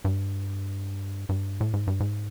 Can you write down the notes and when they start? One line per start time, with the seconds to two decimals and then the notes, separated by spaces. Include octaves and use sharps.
0.05 G2
1.29 G2
1.61 A2
1.74 G#2
1.87 G2
2.00 G#2